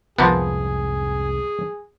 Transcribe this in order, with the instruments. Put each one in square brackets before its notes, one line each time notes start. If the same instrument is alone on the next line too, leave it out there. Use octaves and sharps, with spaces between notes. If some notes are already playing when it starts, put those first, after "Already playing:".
[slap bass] C2 F2 G#2 [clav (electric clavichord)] F3 A#3 B3 [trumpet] G#4